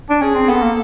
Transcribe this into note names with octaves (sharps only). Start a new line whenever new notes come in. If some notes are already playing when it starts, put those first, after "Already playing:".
D4
C#4 G#4
C4
B3 A4
A#3